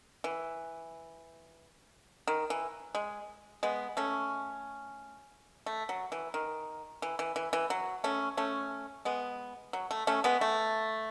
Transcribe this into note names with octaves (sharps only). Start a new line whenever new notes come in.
E3
D#3
E3
G#3
G#3 B3
A3 C#4
A3
F#3
E3
D#3
E3
E3
E3
E3
F#3
A3 C#4
A3 C#4
G#3 B3
F#3
A3
A3 C#4
G#3 B3
A3